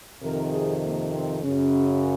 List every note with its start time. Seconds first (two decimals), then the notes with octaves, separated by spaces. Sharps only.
0.23 F2 C3 D#3 A#4
0.53 G#4
0.82 A#3
1.13 C4
1.42 F#2 C#3 C#4